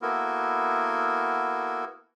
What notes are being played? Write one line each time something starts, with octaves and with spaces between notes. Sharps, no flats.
A#3 B3 E4 F#4 A4 A#4